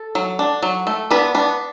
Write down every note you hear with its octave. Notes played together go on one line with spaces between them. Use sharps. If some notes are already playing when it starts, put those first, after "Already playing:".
Already playing: A4
F#3
D4
F#3
A3
B3 D4 B4
B3 D4 B4